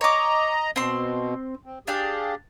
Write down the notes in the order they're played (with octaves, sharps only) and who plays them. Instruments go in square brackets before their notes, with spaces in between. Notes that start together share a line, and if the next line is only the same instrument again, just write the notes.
[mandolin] C#5 D6 [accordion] D#5 A#5
[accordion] B2 [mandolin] C4 C6
[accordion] C4
[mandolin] D4 F5 G5 [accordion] G4 G#4